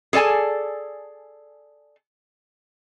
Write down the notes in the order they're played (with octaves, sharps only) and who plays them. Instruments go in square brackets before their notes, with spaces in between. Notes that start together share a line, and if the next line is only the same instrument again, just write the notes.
[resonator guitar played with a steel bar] G#4 A4 D5 G#5 A5